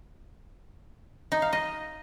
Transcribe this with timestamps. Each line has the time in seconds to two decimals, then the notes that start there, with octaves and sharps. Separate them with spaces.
1.32 D#4
1.42 F5
1.53 D#5